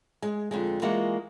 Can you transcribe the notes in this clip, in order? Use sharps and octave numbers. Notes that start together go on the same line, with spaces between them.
G#3
F2 D3 G#3
E3 G#3 A#3 F4 F#4